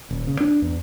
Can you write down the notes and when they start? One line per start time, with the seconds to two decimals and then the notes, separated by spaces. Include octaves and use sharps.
0.11 D#1
0.27 C#3
0.40 D4
0.62 E2